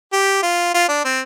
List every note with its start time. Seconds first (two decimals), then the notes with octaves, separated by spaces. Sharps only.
0.13 G4
0.43 F4
0.74 F4
0.88 D4
1.05 C4